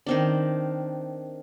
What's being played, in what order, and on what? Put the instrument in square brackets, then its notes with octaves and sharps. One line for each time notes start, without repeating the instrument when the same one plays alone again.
[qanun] D#3 C4 D4